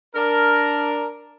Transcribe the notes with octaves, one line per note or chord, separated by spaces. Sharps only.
D4 A#4